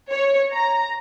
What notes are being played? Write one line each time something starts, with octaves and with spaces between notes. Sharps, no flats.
C#5
A#5